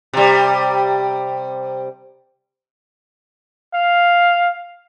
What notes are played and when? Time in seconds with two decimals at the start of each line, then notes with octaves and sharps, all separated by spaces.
0.14 C3 G3
3.74 F5